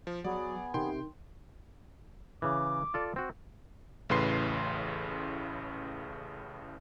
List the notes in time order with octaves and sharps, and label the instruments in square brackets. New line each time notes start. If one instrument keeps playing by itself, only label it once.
[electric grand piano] F3
[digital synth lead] F#3 [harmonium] B3 G#4 [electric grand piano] D5
[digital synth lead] C3 [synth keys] D#3 [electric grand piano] G5 C6
[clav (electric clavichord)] C#3 E3 [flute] D6
[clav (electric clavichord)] F4 A4 D5
C4 F#4
[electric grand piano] A1 A2 C#3 B4 C6 C7